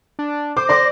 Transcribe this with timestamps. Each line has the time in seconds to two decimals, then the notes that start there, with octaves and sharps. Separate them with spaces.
0.19 D4
0.57 C5 D6
0.69 D5 C6 D6 A#6